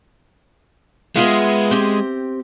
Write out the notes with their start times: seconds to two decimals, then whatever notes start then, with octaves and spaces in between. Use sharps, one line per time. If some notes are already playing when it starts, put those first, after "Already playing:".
1.16 G#3 B3 F4 E5
1.71 C4 G4